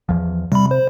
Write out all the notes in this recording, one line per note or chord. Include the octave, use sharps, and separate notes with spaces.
E2 F3
C3 G3 B5
C5